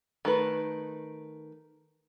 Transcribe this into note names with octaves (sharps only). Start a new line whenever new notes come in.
D#3 A3 B4